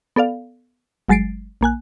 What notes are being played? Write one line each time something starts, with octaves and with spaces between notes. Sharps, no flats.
B3 A4 D5 F5
G1 F#3 G#3 A6 C7 D7
A#1 A#3 G#5 F#6